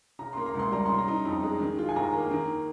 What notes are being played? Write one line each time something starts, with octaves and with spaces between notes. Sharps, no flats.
C#3 A#5
A#3 C6
A#5
C#2 C6
G3 A#5
C#3 C6
A#5
D#4
F2
G#3
D#3
F4
G#5
D#2 A#5
A#3
D#3